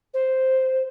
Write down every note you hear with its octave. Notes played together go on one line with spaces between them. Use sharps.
C5